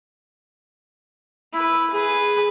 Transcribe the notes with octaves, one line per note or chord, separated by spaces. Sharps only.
E4 B4
G#4 B4